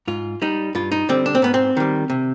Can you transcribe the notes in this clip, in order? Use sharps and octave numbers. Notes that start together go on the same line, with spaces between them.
G#2 F4
G3 D#4
G2 F4
D#4
D3 G3 C4
D4
C4
G#2 B3
C4
D#3 G3
C3